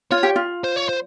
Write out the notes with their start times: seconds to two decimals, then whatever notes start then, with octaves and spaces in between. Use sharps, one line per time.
0.11 F4 C#5
0.23 G4
0.36 F4
0.64 C5
0.76 C#5
0.89 C5